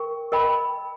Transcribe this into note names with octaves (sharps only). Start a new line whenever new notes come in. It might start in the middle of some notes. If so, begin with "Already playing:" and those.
Already playing: A#4 G5 C#6
A#4 D#5 G5 B5